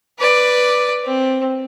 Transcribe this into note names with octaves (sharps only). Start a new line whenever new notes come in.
B4 D5
C4